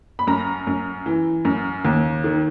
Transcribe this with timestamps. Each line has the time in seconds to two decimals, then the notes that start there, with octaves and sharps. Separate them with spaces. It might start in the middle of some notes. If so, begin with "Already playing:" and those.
0.19 B5
0.27 F#2 A#5
0.67 F#2
1.06 E3
1.45 F#2
1.85 D#2
2.24 D#3